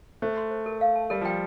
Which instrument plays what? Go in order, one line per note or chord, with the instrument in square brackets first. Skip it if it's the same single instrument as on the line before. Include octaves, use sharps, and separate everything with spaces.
[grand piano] A3 [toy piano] C5
[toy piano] C6
C5
A#4
F5
A5
[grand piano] G3 [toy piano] A#4
[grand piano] F3 [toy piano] G5